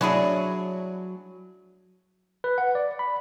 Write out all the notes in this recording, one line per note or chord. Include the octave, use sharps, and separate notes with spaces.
F#3 C#4 D4 E4 G#4
B4
F#5
D5
B5